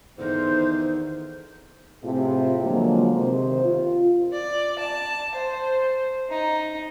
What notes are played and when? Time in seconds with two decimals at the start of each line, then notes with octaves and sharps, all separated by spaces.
0.18 E2 D3 D#3 C5
2.02 A2 C3 F4 G#4
2.62 D3 F3 F#3 G#3 A#3
3.14 C3 D#3 C5
3.64 F4
4.33 D5
4.79 A5
5.35 C5
6.30 D#4